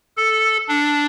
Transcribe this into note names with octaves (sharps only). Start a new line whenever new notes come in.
A4
D4